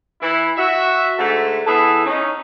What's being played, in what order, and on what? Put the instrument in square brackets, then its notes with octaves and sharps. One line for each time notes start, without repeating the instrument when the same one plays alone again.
[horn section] E3 E4
F#4 E5
G#2 D3 A3 F#4 A4
E3 B3 G#4 A4 E5
C#4 D#4